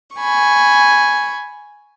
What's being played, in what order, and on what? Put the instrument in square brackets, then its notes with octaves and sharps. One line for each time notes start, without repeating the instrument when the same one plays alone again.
[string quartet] G#5 B5 C#6